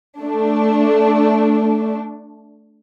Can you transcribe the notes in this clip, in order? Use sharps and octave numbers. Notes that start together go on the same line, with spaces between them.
A3 D4